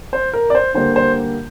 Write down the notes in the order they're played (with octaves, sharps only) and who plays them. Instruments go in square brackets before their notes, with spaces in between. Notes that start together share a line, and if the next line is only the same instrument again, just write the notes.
[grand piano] C5
A#4
D5
C5
D3 G3 A#3 C5
C5